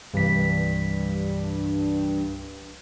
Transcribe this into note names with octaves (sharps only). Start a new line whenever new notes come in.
C2 G2 E3 B6